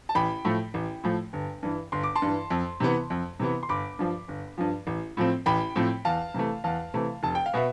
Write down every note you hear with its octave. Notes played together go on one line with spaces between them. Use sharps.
A5
A1 G5 B5
A2 F3 A3
A1
A2 F3 A3
G1
G2 E3
G1 C6
D6
A5 C6
G2 E3
F2
C3 E3 B3
F2
C3 E3 B3
C6
G1 B5 D6
G2 F3
G1
G2 F3
A1
A2 F3 C4
A1 G5 B5
A2 F3 C4
E2 F5 A5
C3 E3 A3
E2 F5 A5
C3 E3 A3
F1 A5
G5
F5
B2 B3 E5